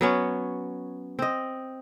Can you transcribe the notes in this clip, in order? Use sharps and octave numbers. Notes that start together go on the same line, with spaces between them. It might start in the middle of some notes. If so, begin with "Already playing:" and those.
F#3 B3 C#4
C4 D#5